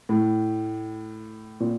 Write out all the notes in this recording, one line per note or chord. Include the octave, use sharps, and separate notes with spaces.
A2
A#2